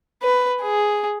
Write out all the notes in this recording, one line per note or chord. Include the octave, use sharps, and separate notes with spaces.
B4
G#4